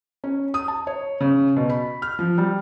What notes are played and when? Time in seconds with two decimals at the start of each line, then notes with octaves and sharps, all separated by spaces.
0.24 C#4
0.54 D#6
0.68 A5
0.87 C#5
1.21 C#3
1.56 B2
1.70 B5
2.02 F6
2.19 F3
2.38 G3